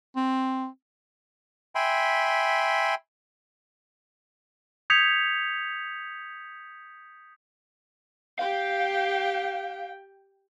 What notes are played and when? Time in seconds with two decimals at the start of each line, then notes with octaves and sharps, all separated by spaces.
0.16 C4
1.75 E5 G5 G#5 B5 C6
4.90 D#6 G6 G#6 B6 C#7 F7
8.39 G4 F5 G5